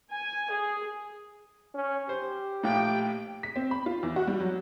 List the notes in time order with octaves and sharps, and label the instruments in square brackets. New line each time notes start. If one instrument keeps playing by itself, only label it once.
[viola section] G#5
G#4
[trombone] C#4
[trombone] G4 [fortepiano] C5
[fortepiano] A#1 A2 [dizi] G5
[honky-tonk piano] B6
C4
B5
F4
E2
F#4
G3
F#3